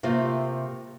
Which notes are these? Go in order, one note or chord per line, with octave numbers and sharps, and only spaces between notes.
C3 A3 A#3 F4 C5